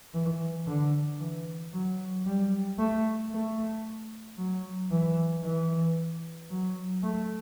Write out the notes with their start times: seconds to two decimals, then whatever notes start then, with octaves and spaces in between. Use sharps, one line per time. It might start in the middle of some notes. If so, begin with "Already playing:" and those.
0.14 E3
0.67 D3
1.20 E3
1.74 F#3
2.26 G3
2.79 A3
3.32 A3
4.38 F#3
4.91 E3
5.44 E3
6.50 F#3
7.03 A3